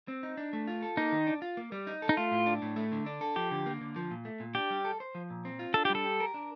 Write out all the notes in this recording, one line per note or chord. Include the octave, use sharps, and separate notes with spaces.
C4
D#4
D4
A3
F4
A4
A#3 D#4
D#3
D4
F4
A#3
G3
D#4
A4
D#4
A3 F4
A2
D4
A2
A3
D3
D4
A4
F3 G4
D3
A#3
D3
F3
A#2
A3
A#2
D4 G4
G3
A4
C5
F3
A#2
C4
F4
D4 A4
G4
G3
A4
G4
A#4
D4